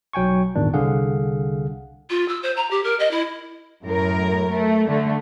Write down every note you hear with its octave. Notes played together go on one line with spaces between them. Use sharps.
B1 F#3 G5 G#5 C#6
G#1 E2 A#2 D#3 D4
C2 D3 G#4 F5 F#5
F4
E6
C5
A#5
G4
A#4
D#5
E4
F#2 A2 A#4
A3
D3 A3